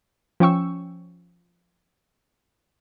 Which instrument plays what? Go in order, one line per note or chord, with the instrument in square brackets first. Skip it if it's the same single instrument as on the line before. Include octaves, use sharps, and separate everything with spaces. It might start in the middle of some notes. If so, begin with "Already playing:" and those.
[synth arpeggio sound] F3 C#4 G5 C#6 E6